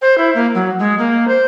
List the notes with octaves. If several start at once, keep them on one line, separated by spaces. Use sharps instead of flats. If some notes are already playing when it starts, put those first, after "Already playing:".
C5
E4
A#3
F#3
G#3
A#3
C5